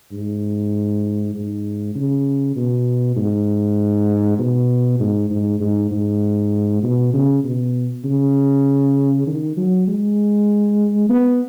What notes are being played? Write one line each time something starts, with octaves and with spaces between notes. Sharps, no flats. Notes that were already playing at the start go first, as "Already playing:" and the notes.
G#2
G#2
C#3
B2
G#2
B2
G#2
G#2
G#2
G#2
B2
C#3
B2
C#3
D#3
F#3
G#3
B3